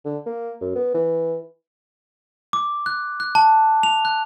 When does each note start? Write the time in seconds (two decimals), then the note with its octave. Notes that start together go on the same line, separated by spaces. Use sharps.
0.05 D3
0.26 A#3
0.61 F#2
0.75 B3
0.94 E3
2.53 D6
2.86 F#6
3.20 F#6
3.35 A5
3.83 F7
4.05 F#6